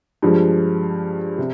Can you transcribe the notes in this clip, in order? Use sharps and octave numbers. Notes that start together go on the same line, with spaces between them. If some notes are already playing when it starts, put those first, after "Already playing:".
G2 F3 G#3
C3